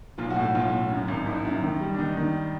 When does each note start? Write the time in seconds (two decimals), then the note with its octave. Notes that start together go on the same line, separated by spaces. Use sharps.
0.18 B1 F4
0.30 F#4
0.36 A2
0.42 F#4
0.54 B1 F4
0.73 A2
0.90 F#2
1.08 G#1
1.17 D#4
1.26 G#1 E4
1.45 F#2
1.63 D#3
1.80 G3
1.94 D4
1.98 D#3 D#4
2.17 D#3